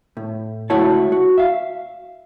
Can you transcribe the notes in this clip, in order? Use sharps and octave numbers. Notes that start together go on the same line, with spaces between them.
A2
C#2 A3 E4 F#4 C#5 A5
F#4
E5 F5